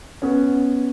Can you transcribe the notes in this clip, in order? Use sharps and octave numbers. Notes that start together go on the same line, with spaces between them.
B3 C#4